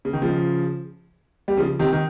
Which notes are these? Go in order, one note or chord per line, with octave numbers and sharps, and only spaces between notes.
C#3
D#3
C#3 F3
G3
C#3 F3
C3 D#3
D#3